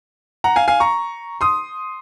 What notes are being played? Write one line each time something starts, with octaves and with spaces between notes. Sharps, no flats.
F#5 A#5
F5 G#5
F5 G#5
A#5 C#6
C6 D#6